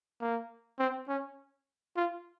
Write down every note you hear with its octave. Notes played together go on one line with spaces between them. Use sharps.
A#3
C4
C#4
F4